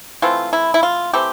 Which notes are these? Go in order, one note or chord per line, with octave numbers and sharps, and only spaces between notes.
E3 A3 C4 F4
E4
E4
F4
E3 A3 C4 G4